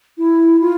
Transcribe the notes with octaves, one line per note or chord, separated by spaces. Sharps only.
E4
F4